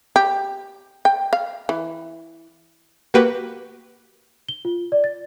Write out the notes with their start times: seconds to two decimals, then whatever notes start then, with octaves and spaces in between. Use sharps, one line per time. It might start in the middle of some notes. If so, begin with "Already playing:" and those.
0.16 G4
1.05 G5
1.33 F5
1.69 E3
3.14 A#3 F#4 G4 B4
4.48 G7
4.65 F4
4.92 D5
5.04 A6